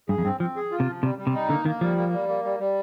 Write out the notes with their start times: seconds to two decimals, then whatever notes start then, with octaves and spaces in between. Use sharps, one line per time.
0.09 G2 G#4
0.18 F2
0.25 G2 C4
0.40 F3 C4
0.56 G#4
0.72 F4
0.80 C3
0.88 F3
1.03 C3 G3
1.18 G3
1.27 C3
1.34 D#4
1.50 D3 A#3
1.65 D#3 A#3
1.81 F3 G3
1.97 A#3
2.13 G3
2.29 A#3
2.44 G3
2.59 G3